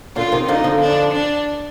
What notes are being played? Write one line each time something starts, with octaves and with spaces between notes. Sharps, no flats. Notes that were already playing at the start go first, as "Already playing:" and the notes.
A#2 D3 F4
C3 D#3
D3 F3 D#4
D3 F3
D4
D4